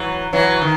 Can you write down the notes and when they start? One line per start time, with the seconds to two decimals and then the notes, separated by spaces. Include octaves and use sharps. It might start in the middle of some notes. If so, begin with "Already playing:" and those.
Already playing: E3 F#3
0.33 E3 F#3
0.62 D#3